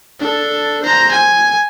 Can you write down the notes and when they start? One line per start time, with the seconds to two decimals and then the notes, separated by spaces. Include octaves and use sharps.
0.20 D4 A4
0.82 C5 A#5
1.12 G#5